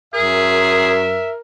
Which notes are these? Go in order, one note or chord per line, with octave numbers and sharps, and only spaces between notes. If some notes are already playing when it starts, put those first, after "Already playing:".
F#2 G#4 A#4 E5